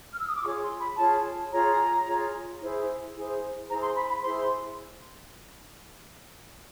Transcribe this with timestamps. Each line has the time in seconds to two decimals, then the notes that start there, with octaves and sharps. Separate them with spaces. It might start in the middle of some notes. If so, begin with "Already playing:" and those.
0.12 F6
0.20 E6
0.27 D#6
0.35 D6
0.43 F4 G#4 C#5 C#6
0.61 C6
0.79 B5
0.97 F4 G#4 C#5 A5
1.51 F4 G#4 C#5 A#5
2.06 F4 G#4 C#5
2.60 E4 G#4 C5
3.15 E4 G#4 C5
3.69 E4 G#4 C5 A#5
3.82 C6
3.96 B5
4.09 B5
4.23 E4 G#4 C5 C6